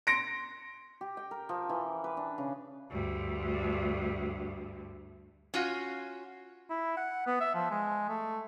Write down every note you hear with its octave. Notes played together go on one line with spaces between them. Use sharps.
C6 A#6 C#7 D7
G4
G5
A#4
F3
E3
B4
D4
C#3
D2 G2
C#4 F4 F#4
E4
F#5
B3
E5
F3
G#3
A3